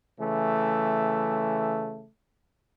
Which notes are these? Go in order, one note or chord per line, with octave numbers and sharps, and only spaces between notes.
C#3 E3 A3